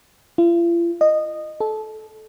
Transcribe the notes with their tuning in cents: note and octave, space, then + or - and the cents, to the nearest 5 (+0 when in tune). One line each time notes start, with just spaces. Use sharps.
F4 -45
D#5 -15
A4 -20